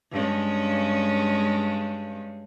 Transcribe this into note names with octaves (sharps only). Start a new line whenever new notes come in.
G2 G#3 C#4